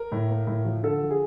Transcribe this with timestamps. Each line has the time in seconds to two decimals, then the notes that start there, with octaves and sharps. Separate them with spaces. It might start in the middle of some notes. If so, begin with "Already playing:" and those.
Already playing: A#4
0.12 A2
0.29 A#3
0.47 A2
0.65 F3
0.83 D3 A4
1.01 F3
1.11 G#4